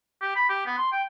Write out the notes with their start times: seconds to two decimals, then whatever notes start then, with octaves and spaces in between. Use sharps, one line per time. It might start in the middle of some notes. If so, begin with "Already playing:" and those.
0.21 G4
0.36 B5
0.49 G4
0.66 B3
0.78 C6
0.92 G5